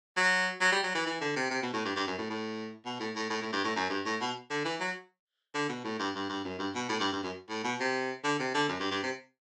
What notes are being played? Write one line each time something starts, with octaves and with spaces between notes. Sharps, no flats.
F#3
F#3
G3
F#3
E3
E3
D3
C3
C3
B2
A2
G2
G2
F#2
A2
A2
B2
A2
A2
A2
A2
G2
A2
F#2
G2
A2
B2
D3
E3
F#3
D3
B2
A2
G2
G2
G2
F#2
G2
B2
A2
G2
G2
F#2
A2
B2
C3
D3
C3
D3
F#2
G2
G2
C3